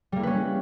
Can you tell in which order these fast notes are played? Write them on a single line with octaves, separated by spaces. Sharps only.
G3 A#3 E4 B4 C#4